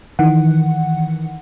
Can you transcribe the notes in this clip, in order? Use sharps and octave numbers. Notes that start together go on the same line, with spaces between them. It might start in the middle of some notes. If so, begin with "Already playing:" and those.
D#3 E3 F#5